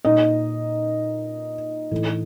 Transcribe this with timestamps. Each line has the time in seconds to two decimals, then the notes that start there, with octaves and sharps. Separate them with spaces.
0.05 A#2 D#4 D#5
1.91 A2 E3